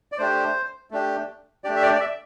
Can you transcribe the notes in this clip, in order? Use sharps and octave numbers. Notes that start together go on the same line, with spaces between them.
D5
A3 D4 G4 C5
A3 D4 G4
A3 D4 G4 D5
E5
D5
D5
E5